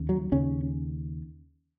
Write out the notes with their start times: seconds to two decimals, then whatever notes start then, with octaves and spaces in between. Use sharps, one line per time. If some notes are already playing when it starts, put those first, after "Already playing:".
Already playing: D#2 C#3
0.09 F#3
0.32 D#2 C#3 C#4